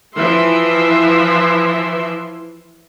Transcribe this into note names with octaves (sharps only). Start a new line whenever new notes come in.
E3 F3 E5 C6